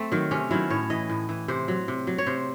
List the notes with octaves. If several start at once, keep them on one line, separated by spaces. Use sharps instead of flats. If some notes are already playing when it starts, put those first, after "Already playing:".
Already playing: A3 C4
D#3 F#3
C3 C#4
D#3 F#3 E4
A2 C#5
E3 D#5
A2
E3
C3 C5
F#3
C3
F#3
C#5
C3 C5